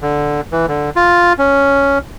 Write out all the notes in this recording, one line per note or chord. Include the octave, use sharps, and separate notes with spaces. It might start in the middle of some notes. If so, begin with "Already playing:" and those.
D3
E3
D3
F4
C#4